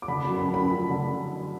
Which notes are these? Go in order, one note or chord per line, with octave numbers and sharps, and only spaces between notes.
D6
D3 B5
B5
F#2
B5
F#2
B5
F3
D3